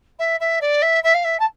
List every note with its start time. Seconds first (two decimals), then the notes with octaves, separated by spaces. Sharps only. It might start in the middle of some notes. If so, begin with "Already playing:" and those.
0.18 E5
0.40 E5
0.61 D5
0.82 E5
1.03 E5
1.14 F5
1.24 E5
1.39 A5